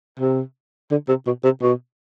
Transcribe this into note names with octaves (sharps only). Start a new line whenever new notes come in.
C3
D3
C3
B2
C3
B2